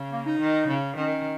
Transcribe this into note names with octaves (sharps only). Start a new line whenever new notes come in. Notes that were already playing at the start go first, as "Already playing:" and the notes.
Already playing: C#3
A#3
D#4
D#3
C#3
D#3 C#4